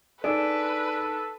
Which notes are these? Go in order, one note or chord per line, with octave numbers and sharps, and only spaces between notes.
D4 D#4 G#4 A4 B4 D7